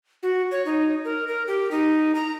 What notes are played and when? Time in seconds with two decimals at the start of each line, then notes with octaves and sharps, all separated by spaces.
0.23 F#4
0.51 C#5
0.66 D#4
1.05 A#4
1.28 A#4
1.47 G4
1.71 D#4
2.15 A#5